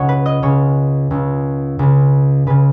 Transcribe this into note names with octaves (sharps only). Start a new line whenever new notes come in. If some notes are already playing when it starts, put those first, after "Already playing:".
Already playing: C#2 C#3 C#5 D#5 F#5
B4
D#5
C#2 C#3 C#5
C#2 C#3
C#2 C#3
C#2 C#3 B4